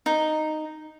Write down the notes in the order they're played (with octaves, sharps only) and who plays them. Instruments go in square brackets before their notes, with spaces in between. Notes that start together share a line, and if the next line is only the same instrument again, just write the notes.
[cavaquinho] D#4